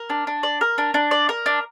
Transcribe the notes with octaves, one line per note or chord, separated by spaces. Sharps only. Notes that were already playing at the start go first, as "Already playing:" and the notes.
Already playing: A#4
D4
D4
D5
A#4
D4
D4
D5
A#4
D4